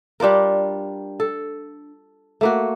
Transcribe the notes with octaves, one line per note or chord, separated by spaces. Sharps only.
G3 D4 F4 A#4
A4
A3 A#3 F#4